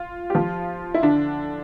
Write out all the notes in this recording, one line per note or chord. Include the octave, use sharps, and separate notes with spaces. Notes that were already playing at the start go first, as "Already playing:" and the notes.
Already playing: F4
G4
F3 F4
E4
D3 D4